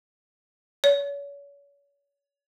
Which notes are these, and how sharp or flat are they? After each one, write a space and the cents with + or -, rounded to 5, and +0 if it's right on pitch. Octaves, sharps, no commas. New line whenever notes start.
C#5 +35